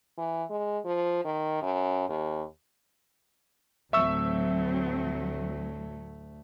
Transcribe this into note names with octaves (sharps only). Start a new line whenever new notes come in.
E3
G#3
F3
D#3
F#2
D#2
D2 A2 F#3 A3 C4 E5 C#6 E6